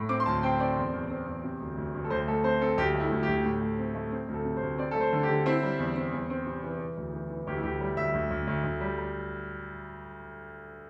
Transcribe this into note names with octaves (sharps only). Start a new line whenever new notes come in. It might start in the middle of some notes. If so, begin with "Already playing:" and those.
Already playing: A2
C4 D6
C6
D2 A5
C4 G5
C4 D5
E2
E2
C4
E2
C3
D2
D2
D2
A4
D2 C5
A3 A4
C4 C5
C4 A4
D2 G4
A3
E4
D2
D2 G4
A2
A3
C4
A3
C4
D2
A4
C3
C5
D2
C4 D5
A3 A4
C5
D3
G4
D3
C4 E4
G3
E2
C4
E2
C4
C3
E3
E3
D2
E3
E3
D2 G4
E4
D2 G4
G3
D2 E5
D2
D2
D2
D2
G3
G3